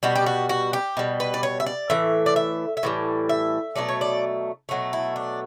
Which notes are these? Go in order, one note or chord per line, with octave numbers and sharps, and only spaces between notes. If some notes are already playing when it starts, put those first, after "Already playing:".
B2 G3 F#4
G4
F#4
F#4
G4
B2 G3
B4
D5
C#5
E5
D5
A2 E3 E5
D5
E5
E5
A2 E3 G3
E5
B2 F#3 A3 D5
C#5
D5
B2 F#3 A3
E4
D4